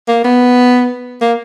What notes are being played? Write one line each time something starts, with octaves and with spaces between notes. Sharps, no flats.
A#3
B3
A#3